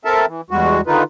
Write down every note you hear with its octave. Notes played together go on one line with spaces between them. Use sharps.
C4 A4 A#4 E5 A5
E3
E2 G3 G#3 F#4
D3 D#3 D#4 F4 B4